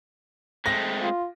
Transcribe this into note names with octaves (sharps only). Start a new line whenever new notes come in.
G#3 A3 C4 A#6
F4